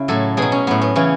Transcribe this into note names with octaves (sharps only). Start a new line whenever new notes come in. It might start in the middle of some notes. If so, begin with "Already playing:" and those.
Already playing: C#3 E4
A2 F#3 A4
B2 F#3 G#4
C#4
A2 F#3 B3
B3
C#3 E3 C#4